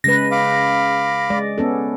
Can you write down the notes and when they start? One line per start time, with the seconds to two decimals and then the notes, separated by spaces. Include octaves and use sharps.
0.04 C#3 G#3 B4 A#6
0.31 F5 B5 D6
1.30 G#3 D5
1.58 B3 C#4 A4